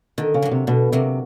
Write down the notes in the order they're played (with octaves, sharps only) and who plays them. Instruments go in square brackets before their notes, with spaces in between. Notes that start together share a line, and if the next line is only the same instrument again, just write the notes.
[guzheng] D3 [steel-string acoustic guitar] D#3
[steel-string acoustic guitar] C#3
[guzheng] F#3 A#3
[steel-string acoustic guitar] C3
[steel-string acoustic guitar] B2 [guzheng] D3
[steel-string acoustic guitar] C3 [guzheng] F#3 A#3